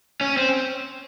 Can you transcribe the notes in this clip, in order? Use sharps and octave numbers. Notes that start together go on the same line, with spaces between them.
C#4
C4